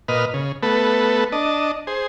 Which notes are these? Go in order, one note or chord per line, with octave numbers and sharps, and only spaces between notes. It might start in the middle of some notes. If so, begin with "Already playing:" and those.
A#2 B4 D#5 F6
C#3
A3 B3 A4 B4
D4 D#5 A5
G#4 C5